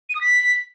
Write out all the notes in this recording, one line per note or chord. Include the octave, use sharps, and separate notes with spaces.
D#7
D#6
B6